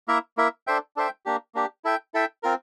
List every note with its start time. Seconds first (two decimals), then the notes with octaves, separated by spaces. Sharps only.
0.08 A#3 E4 A#4 E5
0.37 A#3 E4 A#4 E5
0.67 D4 A4 C5 E5 G5
0.96 D4 A4 C5 E5 G5
1.26 A#3 D4 G4
1.55 A#3 D4 G4
1.85 E4 A4 E5 G5
2.14 E4 A4 E5 G5
2.43 C4 F4 A#4